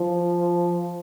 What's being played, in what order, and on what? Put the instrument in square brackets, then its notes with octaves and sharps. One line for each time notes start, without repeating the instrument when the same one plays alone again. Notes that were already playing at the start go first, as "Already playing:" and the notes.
Already playing: [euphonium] F3